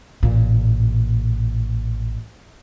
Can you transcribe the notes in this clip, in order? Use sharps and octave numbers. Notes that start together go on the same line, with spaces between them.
A1 A#2